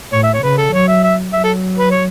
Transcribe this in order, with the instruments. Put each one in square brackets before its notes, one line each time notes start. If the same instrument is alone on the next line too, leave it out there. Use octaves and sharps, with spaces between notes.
[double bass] A2 [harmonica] C#5
[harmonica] E5
C#5
[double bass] C#3 [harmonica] B4
[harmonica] A4
[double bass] F#3 [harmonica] C#5
[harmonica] E5
E5
[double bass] F#3 [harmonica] E5
[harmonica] A4
B4
C#5